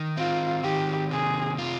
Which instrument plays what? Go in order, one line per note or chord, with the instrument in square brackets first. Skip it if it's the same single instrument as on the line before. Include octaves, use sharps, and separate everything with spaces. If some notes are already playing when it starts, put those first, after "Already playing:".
Already playing: [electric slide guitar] D#3
[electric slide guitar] C4 [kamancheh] F4
[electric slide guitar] D#3 [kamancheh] G4
[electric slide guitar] C3 [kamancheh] G#4
[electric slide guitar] F4